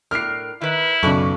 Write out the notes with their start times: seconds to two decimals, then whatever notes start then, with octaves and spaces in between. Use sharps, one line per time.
0.11 A2 D4 A#4 F6 C7
0.61 D#3 E4 B4
1.03 B1 F#2 C#3 B3 C#4 A4 D5 C#6